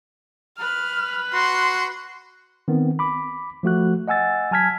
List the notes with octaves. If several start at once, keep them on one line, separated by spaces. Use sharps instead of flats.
B4 F6
F#4 C6
D#3 B3 C4
B5 D6
F3 A3 F#4 F#6
D#5 F#5 G#5 E6 A6
F#3 G#5 A5 F6 G#6 B6